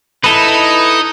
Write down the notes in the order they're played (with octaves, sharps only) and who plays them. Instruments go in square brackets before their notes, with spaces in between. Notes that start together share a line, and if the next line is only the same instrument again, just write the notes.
[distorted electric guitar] D#4 [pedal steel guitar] E4 A4 B4